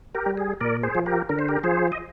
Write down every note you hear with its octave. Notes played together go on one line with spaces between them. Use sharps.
G4 A#4
G3
G#4
A#2 A#4 D5
G#4 C5
F3
G4 A#4
D3 A#4
C5
G4 A#4
F3 G#4 C5
D#5